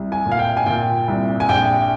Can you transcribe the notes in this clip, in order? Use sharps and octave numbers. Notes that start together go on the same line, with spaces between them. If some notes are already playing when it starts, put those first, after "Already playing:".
Already playing: C2
G#5
A#2
F5
G5
G#5
A#2 G5
C2
G#5
A#1 G5